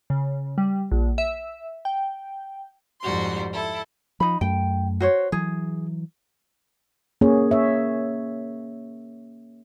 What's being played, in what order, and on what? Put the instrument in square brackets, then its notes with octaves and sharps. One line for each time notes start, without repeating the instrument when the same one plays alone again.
[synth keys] C#3
G3
A#1
E5
G5
[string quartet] F2 G#2 G3 F#4 C6
E4 A4
[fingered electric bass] F3 [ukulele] D#4 B5
[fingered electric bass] F#2 A3 [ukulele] G5
[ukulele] F#4 C5 C#5
[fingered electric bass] E3 F#3 [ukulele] G#4
[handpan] A#3 C#4 G#4 C#5
C#5 E5